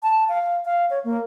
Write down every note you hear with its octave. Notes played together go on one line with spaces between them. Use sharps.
A5
F5
F5
C#5
A#3